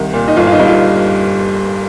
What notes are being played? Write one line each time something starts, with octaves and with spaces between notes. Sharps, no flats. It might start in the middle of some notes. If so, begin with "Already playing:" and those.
Already playing: C2 D#3
A#2
D#4
G1 F4
F4
D#4
G2
F4